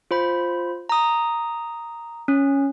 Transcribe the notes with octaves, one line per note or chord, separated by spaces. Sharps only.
F4 C5 B5
A#5 D#6
C#4